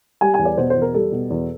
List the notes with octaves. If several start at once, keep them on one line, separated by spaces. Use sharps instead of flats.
G3 G#5
E2 G#5
D5
B2 C5
C5
E2
A#4
G3 A4
B2
E2